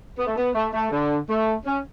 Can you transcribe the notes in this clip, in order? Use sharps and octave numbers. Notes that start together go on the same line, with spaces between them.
B3
A3
B3
A3
A3
D3
A3
C#4